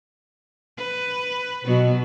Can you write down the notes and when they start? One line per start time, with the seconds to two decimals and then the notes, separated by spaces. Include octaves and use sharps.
0.78 B4
1.64 B2 F#3 B3 F#4